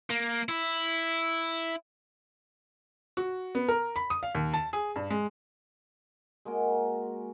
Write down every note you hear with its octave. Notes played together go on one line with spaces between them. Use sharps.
A#3
E4
F#4
B3
A#4
B5
D#6
F5
D#2
A5
G#4
G2
G#3
G#3 A#3 F#4 A#4